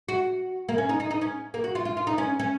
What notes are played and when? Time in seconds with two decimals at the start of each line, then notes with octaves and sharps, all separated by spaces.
0.08 F#4
0.69 A#3
0.78 C#4
0.89 D#4
1.00 D#4
1.11 D#4
1.21 C#4
1.54 A#3
1.64 F#4
1.75 F4
1.85 F4
1.97 F4
2.07 D#4
2.18 C#4
2.39 C#4